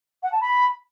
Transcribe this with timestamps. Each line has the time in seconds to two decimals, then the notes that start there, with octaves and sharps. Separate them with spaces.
0.23 F#5
0.32 A5
0.41 B5